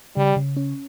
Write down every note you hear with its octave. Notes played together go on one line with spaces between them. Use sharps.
C#3 G3
C#3
C#4